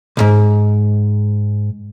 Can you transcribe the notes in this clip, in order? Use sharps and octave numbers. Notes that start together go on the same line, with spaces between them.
C2 G#2